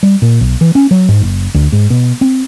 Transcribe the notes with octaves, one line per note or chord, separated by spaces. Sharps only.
G3
A#2
B1
E3
C#4
F#3
G#2
F#1
D2
G#2
B2
C4